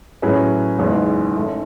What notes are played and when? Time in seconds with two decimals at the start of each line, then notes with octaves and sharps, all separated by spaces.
0.22 A2 F#3 C#4 G#4 B4
0.79 F#1 E2 D#3 G#3 B3
1.36 F#2 D#3 A3